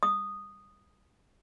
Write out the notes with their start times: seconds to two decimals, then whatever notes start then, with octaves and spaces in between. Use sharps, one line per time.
0.03 D#6